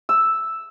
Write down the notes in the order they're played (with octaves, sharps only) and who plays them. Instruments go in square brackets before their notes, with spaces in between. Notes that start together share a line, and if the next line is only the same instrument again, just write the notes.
[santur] E6